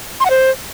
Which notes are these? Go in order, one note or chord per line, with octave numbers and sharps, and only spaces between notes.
C6
F#5
C5